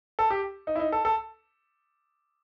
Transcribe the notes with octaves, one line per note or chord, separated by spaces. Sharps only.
A4
G4
D#4
E4
D#4
A4
A4